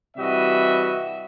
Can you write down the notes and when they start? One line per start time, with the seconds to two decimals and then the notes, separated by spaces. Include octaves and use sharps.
0.17 C3 E3 G3 F#4 D#5 E5